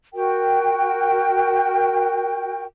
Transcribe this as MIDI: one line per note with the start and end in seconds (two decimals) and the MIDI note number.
0.13 2.64 66
0.13 2.64 70
0.13 2.64 79